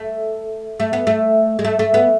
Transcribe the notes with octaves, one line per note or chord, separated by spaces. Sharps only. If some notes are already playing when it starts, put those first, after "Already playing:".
Already playing: A3
A3
B3
A3
G#3
A3
A3
B3